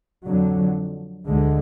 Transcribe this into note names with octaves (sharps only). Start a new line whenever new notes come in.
F2 D3 F#3
D2 D3 G#3